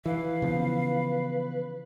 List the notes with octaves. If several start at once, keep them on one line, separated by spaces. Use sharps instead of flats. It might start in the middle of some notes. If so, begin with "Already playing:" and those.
E3 B4 F5
C#3 F3 B3